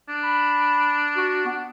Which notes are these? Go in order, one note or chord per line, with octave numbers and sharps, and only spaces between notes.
D4
B5
F#4
B3